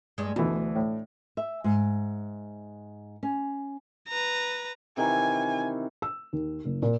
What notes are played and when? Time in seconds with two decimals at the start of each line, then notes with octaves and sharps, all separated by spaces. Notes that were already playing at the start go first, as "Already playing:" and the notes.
0.18 G2 G#3
0.36 D2 B2 D3 E3
0.75 A2
1.37 E5
1.64 G#2
3.23 C#4
4.09 B4 A#5
4.97 C3 D#3 E3 G#5
6.02 E6
6.33 D#2
6.65 F#1
6.82 A#2